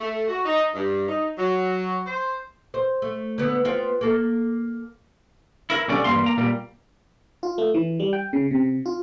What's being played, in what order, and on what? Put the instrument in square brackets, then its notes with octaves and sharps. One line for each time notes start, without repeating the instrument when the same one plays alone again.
[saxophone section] A3
F#4
D#4
G2
D#4
F#3
C5
[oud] C5
A3
D3 B3
B3 C4 F4
A#3 A4
[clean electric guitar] E4 A#4
B1 D3 G3 C#4 D5
E2 G2 G3 A#3 F5 C6
A#3 A#5
A#2 G3 A#3
[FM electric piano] F4
A3
E3
G3
G5
C#3
C3
F4